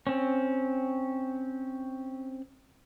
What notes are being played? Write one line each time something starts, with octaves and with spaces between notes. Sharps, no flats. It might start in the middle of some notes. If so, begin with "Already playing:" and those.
C4 C#4